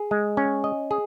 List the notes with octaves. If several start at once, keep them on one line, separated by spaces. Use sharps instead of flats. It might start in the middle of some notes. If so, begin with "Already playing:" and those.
Already playing: G#4
G#3
C#4
D#5
G#4